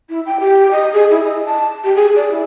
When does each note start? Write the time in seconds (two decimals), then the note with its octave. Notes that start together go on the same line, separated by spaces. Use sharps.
0.09 E4
0.26 G5
0.40 G4
0.71 D#5
0.93 G#4
1.11 E4
1.24 D#5
1.46 A5
1.84 G4
1.95 G#4
2.16 D5
2.31 E4